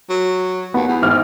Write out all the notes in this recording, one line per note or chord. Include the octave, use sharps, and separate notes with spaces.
F#3
D#2 B3
E2
G#1 F6